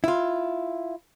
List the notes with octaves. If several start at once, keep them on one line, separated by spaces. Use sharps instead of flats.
E4 F4